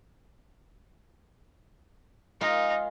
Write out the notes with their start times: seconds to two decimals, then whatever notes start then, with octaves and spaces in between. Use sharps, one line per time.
2.41 G#3 D#4 F4 A#4